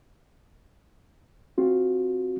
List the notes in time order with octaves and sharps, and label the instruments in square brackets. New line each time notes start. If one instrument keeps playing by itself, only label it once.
[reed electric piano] C4 F4 F#4